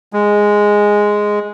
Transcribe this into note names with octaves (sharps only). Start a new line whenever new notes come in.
G#3